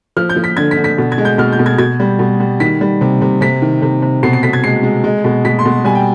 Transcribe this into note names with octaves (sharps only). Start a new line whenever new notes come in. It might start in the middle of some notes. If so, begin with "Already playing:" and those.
F3 F6
G6
F3
B6
D3 G#6
B6
D3
B6
B2
G#6
G#3
G6
B2 F6
G6
B2
G#6
B2 G#6
G3
B2
G3
D#3 B6
G3
C3
C3
C3 B6
D#3
C3
C3
B2 C7
C7
B2 B6
G#6
G#3 C7
G#3
G#3
B2
B2 B6
C6
B2
G3 G#5
G5